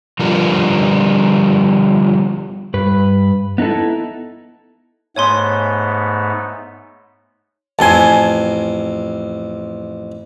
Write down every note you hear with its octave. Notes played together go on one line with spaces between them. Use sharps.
D3 F3 G3 B3 F4 A#4
G2 B4
B3 D#4 E4 A4
G#2 A3 B3 C#5 G#5 C6
A1 F2 G#5 A5 C6